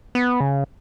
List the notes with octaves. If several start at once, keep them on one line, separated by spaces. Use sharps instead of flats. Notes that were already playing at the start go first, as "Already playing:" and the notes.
B3
C#3